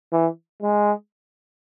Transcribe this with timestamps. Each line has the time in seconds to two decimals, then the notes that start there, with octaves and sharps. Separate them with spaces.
0.12 E3
0.62 G#3